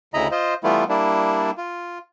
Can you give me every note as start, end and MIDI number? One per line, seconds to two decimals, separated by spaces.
0.14 0.28 38
0.14 0.28 49
0.14 0.28 64
0.14 0.28 75
0.14 0.28 82
0.14 0.28 83
0.31 0.54 65
0.31 0.54 72
0.31 0.54 75
0.64 0.84 52
0.64 0.84 55
0.64 0.84 57
0.64 0.84 59
0.64 0.84 64
0.64 0.84 65
0.89 1.51 55
0.89 1.51 58
0.89 1.51 62
0.89 1.51 64
1.58 1.98 65